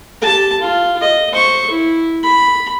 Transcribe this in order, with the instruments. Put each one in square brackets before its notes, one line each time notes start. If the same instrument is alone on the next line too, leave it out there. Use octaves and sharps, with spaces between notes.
[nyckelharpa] G4 A5
F4
D#5
C5 C#6
E4
B5